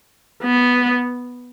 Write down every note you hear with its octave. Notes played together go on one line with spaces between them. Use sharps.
B3